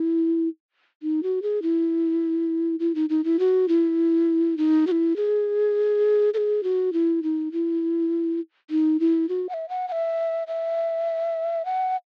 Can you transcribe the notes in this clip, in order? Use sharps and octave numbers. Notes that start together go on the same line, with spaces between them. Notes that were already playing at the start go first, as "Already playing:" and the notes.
Already playing: E4
D#4
F#4
G#4
E4
E4
D#4
D#4
E4
F#4
E4
D#4
F#4
E4
G#4
A4
G#4
F#4
E4
D#4
E4
D#4
E4
F#4
F#5
E5
F#5
F#5
E5
E5
F#5